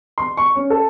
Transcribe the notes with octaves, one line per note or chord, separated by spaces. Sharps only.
C6
C#6
C#4
A4